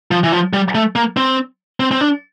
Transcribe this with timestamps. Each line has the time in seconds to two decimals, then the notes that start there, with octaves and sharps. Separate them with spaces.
0.11 F3
0.24 E3
0.32 F3
0.53 G3
0.75 A3
0.96 A#3
1.17 C4
1.80 C4
1.91 C4
2.01 D4